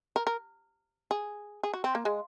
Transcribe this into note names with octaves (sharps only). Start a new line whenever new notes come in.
A#4
A#4
G#4
G#4
F#4
C4
A#3
G#3